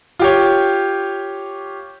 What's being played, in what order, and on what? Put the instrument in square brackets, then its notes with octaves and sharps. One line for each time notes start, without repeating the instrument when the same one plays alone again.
[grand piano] F4 G4 C#5